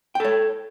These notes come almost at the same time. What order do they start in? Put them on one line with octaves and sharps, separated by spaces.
G5 A4 C#5